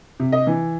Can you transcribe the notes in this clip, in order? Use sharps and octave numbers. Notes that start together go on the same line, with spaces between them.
C3
D#5
E3